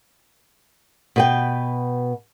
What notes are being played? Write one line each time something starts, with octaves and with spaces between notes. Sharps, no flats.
B2 B4 G5